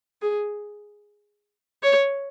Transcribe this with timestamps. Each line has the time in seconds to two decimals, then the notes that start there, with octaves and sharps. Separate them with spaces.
0.22 G#4
1.83 C#5